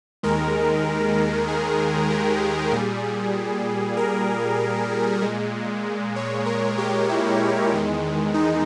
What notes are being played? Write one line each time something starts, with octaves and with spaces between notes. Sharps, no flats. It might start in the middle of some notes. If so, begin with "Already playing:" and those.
D#2 D#3 G#3 A#4
G#4
G4
A#2 G3 G#4
A#4
A#2 G#3
C#5
A#4
G4
E4
E2 D#3 G#3
D#4